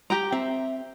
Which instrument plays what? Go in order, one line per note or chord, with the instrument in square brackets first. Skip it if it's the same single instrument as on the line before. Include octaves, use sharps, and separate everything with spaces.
[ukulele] G4 G5 A#5
[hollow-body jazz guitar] C4 [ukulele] E5